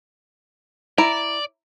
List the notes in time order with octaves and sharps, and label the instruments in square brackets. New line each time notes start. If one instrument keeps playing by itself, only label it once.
[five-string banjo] E4 A#5 [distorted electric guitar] D5